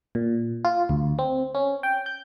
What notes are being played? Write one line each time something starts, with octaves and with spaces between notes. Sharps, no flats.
A#2
F4
D2
C4
C#4
G5
G6